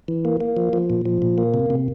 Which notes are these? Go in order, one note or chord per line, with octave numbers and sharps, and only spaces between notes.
E3
A#3
A#3
F3
F3
A#2
F3
A#2
A#3
C3
C3